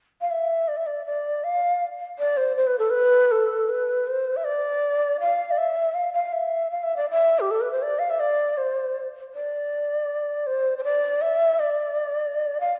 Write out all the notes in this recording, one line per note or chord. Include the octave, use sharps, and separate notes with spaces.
F5
E5
D5
E5
D5
D5
F5
D5
C5
C5
B4
A4
B4
A4
B4
C5
E5
D5
F5
D5
E5
F5
F5
E5
F5
E5
D5
E5
G4
A4
B4
C5
D5
F5
E5
D5
C5
D5
C5
C5
D5
E5
D5
F5